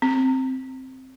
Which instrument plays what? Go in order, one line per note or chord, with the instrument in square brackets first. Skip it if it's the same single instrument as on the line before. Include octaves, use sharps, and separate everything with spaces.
[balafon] C4